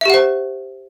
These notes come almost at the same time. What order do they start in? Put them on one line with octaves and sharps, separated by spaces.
E5 G4 F#5 C5